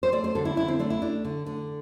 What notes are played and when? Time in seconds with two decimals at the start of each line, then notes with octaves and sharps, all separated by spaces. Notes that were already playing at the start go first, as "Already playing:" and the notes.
0.03 C5
0.12 A3 D5
0.24 C5
0.35 D3 A4
0.45 E4
0.57 D3 E4
0.68 C4
0.79 A3 D4
0.90 E4
1.02 A3 D4
1.25 D3
1.46 D3